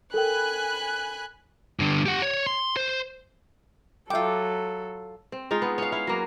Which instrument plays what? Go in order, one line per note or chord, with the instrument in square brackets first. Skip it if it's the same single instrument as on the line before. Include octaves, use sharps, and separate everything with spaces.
[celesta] A4 A#4 G5 [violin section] G#5 B5 F#6
[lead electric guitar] G2 D3
G4 F#5
C#5
C6
C5
[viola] F#3 A4 [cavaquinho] F4 D6 [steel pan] E5 G5
[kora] C4
G#3 D#4 F4
B3
C#4 F5
E4 F5
F#3 A#3